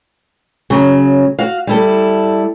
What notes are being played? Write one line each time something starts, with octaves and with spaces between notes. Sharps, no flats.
C#3 F#3
F#4 F5
G3 E4 A4